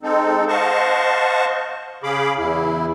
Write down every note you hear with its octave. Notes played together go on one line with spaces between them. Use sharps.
G#3 C4 D#4 A4
C5 D#5 F5 F#5 A5 C#6
C#3 G#4 F5 B5 D6
E2 E4